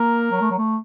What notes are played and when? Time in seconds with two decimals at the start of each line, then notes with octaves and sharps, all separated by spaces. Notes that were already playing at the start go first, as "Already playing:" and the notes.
Already playing: A#3 A#4
0.32 F#3
0.41 A3
0.51 F#3
0.58 A3